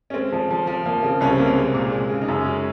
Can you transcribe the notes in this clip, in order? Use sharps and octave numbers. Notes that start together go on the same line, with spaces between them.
C#4
G#3 C4
F3
F3
F3
F3 A#3
C#3 C4
C2 C#4
C4
C3 A#3
C4
G#3
A#2
G#3
C#3
D#4
F#2 C#4
G#3